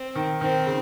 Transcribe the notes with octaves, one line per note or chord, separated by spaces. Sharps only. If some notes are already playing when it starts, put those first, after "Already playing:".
Already playing: C4
D#3
D#3 C4
C#3